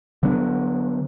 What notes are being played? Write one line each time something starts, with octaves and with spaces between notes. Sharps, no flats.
D3 F#3 B3 D4